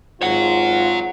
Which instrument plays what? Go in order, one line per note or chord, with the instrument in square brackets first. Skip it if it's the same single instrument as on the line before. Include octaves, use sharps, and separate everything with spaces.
[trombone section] G#1 G#2 F4 [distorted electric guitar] C#5 F#5